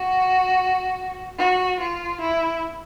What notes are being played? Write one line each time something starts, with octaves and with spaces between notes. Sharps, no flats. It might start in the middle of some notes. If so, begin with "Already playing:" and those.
Already playing: F#4
F#4
F4
E4